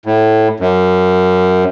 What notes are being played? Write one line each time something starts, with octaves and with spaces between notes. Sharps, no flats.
A2
F#2